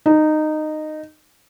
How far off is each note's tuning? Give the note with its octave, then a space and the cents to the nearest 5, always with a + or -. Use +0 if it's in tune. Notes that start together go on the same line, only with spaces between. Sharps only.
D#4 -15